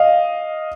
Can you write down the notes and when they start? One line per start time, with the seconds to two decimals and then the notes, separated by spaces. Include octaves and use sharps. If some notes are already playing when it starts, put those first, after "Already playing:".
Already playing: D#5 F5